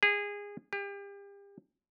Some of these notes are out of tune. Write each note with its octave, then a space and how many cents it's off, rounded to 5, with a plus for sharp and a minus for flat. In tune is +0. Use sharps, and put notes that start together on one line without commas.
G#4 -25
G4 +35